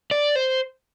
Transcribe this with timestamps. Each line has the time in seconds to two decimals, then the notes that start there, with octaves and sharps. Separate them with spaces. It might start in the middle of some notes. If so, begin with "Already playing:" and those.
0.11 D5
0.36 C5